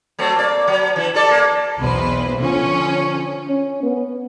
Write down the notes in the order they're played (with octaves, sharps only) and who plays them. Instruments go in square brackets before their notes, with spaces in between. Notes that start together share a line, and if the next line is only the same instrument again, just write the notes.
[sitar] F#3 A3 C4
A#3 D5
F#3
E3 E4
G3 A4 D5
A#3
[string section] B1 E2 B4 C5
D3 F3 C#4
[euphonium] C#4
B3